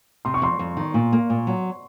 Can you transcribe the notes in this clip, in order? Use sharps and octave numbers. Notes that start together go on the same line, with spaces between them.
C3 C6
C#6
F2 C6
F2
D#3
A#2
A#3
A#2
F#3